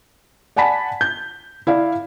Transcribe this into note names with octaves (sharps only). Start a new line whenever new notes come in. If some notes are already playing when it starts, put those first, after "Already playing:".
D5 F#5 G#5 A5 B5 B6
G6
E4 D5 F5